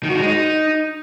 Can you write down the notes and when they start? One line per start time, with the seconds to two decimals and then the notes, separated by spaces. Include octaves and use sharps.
0.03 D#3
0.09 F#4
0.15 D#4
0.20 G#3
0.26 D#4